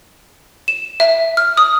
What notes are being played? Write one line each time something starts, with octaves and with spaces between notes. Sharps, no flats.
E7
E5
F6
D#6